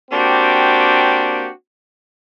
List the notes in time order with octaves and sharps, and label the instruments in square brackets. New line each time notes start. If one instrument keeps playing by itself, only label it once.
[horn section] A#3 C4 D4 F#4 G4